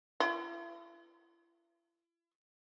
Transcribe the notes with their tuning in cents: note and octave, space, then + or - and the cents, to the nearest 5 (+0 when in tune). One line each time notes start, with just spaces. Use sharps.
E4 +45